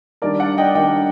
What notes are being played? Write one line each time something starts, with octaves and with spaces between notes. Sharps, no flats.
D#3 G3 D4 A#4 D5
D5 F#5
D#5 G5
D#3 G3 D4 D#5 G5